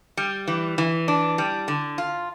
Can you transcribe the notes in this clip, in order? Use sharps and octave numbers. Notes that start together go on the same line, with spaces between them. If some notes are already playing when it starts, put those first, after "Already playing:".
G3
E3
E3
D4
G3
D3
F4